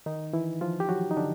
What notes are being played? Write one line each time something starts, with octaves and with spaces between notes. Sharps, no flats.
D#3 D#4
E3 E4
F3 F4
G4
F#3 F#4
D#4
D3 D4